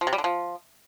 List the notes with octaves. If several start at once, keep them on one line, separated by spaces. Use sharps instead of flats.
F3
C3
G3
D3
F3